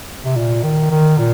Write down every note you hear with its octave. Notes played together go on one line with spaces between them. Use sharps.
C3
A#2
D#3
D#3
A#2